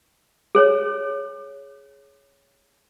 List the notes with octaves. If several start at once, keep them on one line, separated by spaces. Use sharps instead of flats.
G#4 C5 C#5